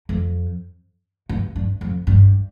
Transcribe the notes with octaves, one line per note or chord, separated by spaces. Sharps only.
F2
G2
G2
F2
G2